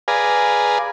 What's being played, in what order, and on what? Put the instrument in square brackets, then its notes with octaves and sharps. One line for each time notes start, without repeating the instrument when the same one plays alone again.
[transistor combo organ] G#4 B4 D5 F5 G#5 A#5